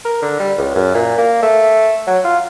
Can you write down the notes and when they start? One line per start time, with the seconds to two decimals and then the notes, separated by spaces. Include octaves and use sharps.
0.05 A#4
0.22 D3
0.40 G3
0.58 C#2
0.75 F#2
0.95 A#2
1.18 A#3
1.43 A3
2.07 F#3
2.24 F4